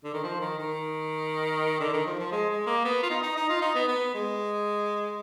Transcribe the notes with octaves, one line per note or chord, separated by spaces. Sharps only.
D3
D#3
F3
D#3
D#3
D3
D#3
F3
F3
G#3
G#3
A#3
B3
F4
D#4
D#4
D#4
F4
D#4
B3
B3
G#3